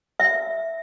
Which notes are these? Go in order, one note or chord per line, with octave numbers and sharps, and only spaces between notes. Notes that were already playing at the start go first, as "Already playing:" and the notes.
E5